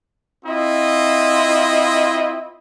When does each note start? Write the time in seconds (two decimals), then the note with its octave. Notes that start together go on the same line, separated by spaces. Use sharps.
0.45 C4 E4 F4 D#5